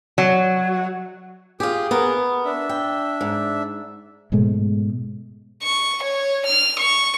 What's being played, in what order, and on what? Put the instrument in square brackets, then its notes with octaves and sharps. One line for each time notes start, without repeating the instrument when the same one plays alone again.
[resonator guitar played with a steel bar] F#3
[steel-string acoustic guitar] F4 G4 [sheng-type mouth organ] G#4
[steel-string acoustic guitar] B3 A#4
[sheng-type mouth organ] D4 E5
[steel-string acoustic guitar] G5
G#2
[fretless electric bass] G#2 B2 G#3 A3
[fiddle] C#6
C#5
F6
C#6